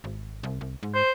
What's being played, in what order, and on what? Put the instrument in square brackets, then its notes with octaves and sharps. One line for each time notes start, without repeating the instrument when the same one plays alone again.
[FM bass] G#1
C2
C2
G#2
[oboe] C5